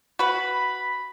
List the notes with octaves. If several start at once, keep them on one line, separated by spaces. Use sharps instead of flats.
F#4 B4 B5